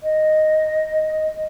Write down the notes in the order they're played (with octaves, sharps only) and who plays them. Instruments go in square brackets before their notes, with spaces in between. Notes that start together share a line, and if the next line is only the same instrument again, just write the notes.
[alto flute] D#5